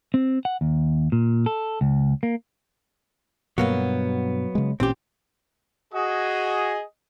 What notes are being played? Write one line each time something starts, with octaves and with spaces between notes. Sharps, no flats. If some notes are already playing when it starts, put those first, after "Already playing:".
C4
F#5
D#2
A#2
A4
C#2
A#3
G2 B2 F#3 A#3 B3
C#3 G#3
A1 A#2 C4 C#4 G4
F#4 G#4 D#5